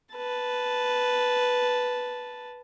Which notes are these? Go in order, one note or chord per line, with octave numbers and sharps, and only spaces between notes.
B4 A5